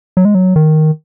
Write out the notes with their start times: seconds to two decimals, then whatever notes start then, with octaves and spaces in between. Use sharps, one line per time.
0.17 F#3
0.25 G#3
0.35 F#3
0.56 D#3